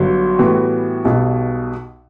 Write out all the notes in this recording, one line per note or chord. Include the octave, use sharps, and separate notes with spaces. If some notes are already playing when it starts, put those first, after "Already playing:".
Already playing: G1 G2 F#3
A2 E3 G3 B3 F#4
B1 B2 G3